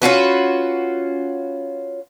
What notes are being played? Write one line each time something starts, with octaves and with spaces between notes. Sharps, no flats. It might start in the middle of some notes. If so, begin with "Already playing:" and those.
C#4 F4 F#4 B4